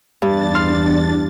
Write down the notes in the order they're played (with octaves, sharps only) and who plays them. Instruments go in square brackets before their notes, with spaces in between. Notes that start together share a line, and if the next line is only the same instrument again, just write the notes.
[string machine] E2 D4 A6 [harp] G2
[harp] C6 F6